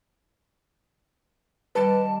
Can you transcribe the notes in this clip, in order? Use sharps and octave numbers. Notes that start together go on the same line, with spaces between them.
D#3 G3 B4 D5 A5